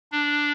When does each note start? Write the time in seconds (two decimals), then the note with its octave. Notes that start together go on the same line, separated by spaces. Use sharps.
0.12 D4